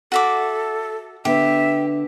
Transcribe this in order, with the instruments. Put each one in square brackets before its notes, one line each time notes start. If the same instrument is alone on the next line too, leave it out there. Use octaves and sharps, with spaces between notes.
[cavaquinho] F#4 E5 D6 [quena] A4
[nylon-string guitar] D3 B3 D4 [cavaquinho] G4 [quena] E5